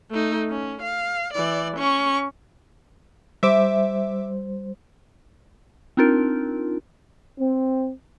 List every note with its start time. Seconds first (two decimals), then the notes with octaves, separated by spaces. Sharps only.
0.11 A3 D#4
0.51 C#4
0.82 F5
1.34 E3 D5
1.77 C#4 C#6
3.43 G3 C5 E5 D6
5.97 C4 D4 D#4 F4 A#4
7.38 C4